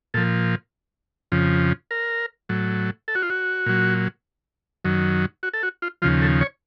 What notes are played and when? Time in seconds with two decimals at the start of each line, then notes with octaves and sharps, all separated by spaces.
0.14 A#2 F3 A4
1.32 F2 C#3 F3
1.91 A#4
2.49 A2 F#3
3.08 A4
3.15 F#4
3.22 F4
3.30 F#4
3.66 A#2 F#3
4.85 F#2 D#3 F#3
5.43 F#4
5.53 A4
5.63 F#4
5.82 F4
6.02 D#2 C#3 F3 F4
6.22 A4
6.41 C#5